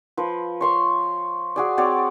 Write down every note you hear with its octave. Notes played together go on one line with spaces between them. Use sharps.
F3 B4
C#5 C6 C#6
F#4 G#4 D5
C4 F#4 C#5 D5